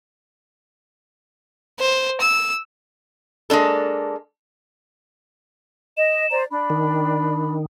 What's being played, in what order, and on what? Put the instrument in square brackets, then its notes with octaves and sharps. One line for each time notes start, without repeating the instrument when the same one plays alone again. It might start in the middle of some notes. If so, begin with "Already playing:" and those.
[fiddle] C5
E6
[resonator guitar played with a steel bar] G#3 A#3 D4 A4
[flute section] D#5 [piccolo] E7
[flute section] C5 D5 A#5
[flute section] D4 [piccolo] B5
[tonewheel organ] D#3